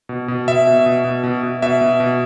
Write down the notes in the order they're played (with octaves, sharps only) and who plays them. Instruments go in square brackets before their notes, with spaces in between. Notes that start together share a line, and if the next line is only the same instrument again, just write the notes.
[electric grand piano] B2
B2
B2 E5
B2
B2
B2
B2
B2
B2 E5
B2
B2